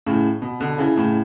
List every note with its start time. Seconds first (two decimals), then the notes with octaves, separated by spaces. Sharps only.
0.07 A2 C#3
0.42 B2
0.60 B2 D3
0.78 C#3 E3
0.96 A2 C#3